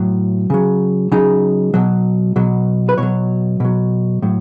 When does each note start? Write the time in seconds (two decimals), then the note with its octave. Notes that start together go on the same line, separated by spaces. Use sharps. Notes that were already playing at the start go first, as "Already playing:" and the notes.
Already playing: A2 F#3
0.50 C#3 F#3
1.12 C#3 F#3 D#4
1.74 B2 F#3
2.36 B2 F#3
2.89 B4
2.98 B2 F#3 C#5
3.60 B2 F#3
4.22 A2 F#3